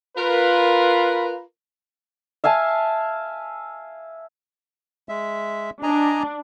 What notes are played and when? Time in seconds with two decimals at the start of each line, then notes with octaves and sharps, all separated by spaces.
0.17 F4 A#4 B4
2.44 E5 F5 G#5 A5
5.09 G#3 E5
5.83 D4 D#5 G#5 A#5